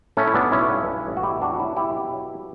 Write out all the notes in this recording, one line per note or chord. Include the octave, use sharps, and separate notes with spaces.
A2 A3 C#4
E4
B1 B3 D4
B1 C#4 E4
G2
G2
A1
F#4
B2 E4 G4
E2 D4 F#4
F#4
F#3 C#4 E4
B2 E4 G4
B2
F#3